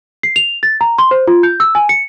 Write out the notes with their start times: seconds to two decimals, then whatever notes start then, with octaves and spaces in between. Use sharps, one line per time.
0.23 C7
0.36 F7
0.63 A6
0.81 A#5
0.98 C6
1.11 C5
1.28 F4
1.43 G6
1.60 E6
1.75 G#5
1.89 C#7